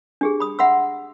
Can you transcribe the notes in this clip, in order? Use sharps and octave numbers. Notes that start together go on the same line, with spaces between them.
D4 G4 G#4
B5 D#6
E5 F#5 B5 C6 E6